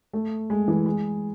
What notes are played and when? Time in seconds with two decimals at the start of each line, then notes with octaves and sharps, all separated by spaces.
0.13 A3
0.50 G#3
0.68 E3
0.86 G#3